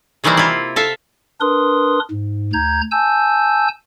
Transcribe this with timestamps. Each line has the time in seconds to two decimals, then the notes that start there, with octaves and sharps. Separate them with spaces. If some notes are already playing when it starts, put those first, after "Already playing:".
0.24 C3 D#3 E3 G3 A#3 C4
0.37 E4 F4
0.76 A4 E5 F5
1.41 D4 A#4 B4 C6 D#6
2.11 G#2
2.53 D2 A#5 G6 G#6
2.91 G#5 A5 E6 G6